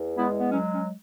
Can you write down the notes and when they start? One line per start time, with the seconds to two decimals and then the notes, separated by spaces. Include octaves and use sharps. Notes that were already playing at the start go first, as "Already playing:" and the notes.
Already playing: E2
0.17 G#3 B3 E4
0.39 B3
0.50 F#3 C#4
0.73 C#4